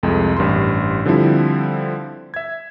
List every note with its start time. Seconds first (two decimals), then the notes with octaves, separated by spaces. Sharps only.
0.03 C2 F2 G#3 A4
0.37 A1 G2 A#4 C6
1.05 D3 F3 G3 C4 E4
2.34 E5 G#6